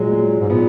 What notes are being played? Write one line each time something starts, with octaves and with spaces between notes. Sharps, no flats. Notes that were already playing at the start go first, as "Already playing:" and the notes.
Already playing: A#2 F#3 G#3
G#3
G#2
A#2 B3